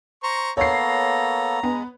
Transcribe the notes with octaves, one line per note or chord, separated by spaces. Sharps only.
C5 A#5 C#6
A#3 B3 A4 C#5 A#5 C7
G#3 B3 G#4